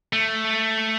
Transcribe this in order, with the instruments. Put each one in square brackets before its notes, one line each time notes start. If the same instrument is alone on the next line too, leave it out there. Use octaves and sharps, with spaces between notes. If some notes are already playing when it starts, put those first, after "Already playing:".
[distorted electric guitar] A3